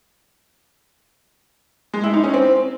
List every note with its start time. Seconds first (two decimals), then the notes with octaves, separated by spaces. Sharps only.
1.94 G#3
2.04 E4
2.14 D#4
2.24 C#4
2.34 C4